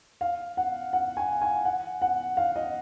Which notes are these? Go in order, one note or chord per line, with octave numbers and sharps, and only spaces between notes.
F5
F#5
F#5
G#5
G#5
F#5
F#5
F5
D#5